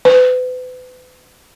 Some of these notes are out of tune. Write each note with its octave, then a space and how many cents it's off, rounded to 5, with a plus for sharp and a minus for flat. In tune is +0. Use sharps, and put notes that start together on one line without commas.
B4 +40